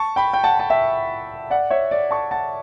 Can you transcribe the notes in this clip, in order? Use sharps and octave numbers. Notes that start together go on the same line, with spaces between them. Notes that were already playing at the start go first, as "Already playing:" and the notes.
Already playing: A5 C#6
G5 B5
G5
F#5 A5
A5
E5 G5
D5 F#5
C#5 E5
D5
A5 C#6
F#5 A5